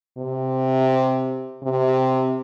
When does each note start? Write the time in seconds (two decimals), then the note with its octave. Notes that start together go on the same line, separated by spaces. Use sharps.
0.18 C3
1.63 C3